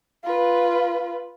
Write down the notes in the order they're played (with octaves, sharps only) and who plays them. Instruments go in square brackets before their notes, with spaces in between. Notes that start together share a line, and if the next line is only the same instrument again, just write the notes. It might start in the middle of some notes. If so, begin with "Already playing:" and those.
[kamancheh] F4 B4